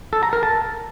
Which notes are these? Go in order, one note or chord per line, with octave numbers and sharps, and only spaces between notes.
A4
A#5
A#4
A5